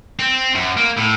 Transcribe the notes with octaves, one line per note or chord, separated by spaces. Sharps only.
C4
F#2
A#3
A2